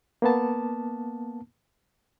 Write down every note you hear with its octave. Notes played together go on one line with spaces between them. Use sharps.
A#3 B3 A5